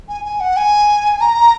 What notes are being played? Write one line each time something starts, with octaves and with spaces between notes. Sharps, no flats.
G#5
G#5
F#5
G#5
A#5